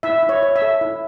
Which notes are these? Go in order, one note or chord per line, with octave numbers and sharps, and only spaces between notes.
E4 E5
E4
C#5
C#5
E5
A4
E4